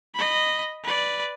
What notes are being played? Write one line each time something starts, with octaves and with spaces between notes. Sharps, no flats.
D#5 B5
B4 D5